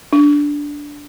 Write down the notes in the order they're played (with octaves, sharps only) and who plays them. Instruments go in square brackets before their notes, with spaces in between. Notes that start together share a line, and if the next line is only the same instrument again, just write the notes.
[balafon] D4